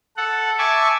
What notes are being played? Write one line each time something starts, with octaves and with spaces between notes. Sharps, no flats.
A4 F#5
E5 G#5 A5 C#6 D6